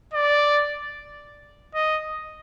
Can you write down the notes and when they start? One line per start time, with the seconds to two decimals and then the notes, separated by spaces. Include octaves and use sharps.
0.13 D5
1.75 D#5